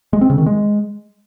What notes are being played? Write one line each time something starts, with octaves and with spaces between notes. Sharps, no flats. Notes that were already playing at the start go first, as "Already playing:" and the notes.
G#3
C4
C#3
D#3
G#3